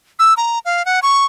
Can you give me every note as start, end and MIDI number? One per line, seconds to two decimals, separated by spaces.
0.19 0.34 88
0.37 0.59 82
0.65 0.85 77
0.85 1.00 78
1.02 1.25 85